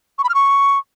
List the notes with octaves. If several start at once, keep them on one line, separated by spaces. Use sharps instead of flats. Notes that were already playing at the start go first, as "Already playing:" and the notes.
C#6
B5
F6
C#6